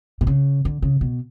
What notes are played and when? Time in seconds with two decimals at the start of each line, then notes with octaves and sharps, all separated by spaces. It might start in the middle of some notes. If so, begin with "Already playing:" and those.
0.21 B2
0.27 C#3
0.65 D3
0.82 C#3
1.01 B2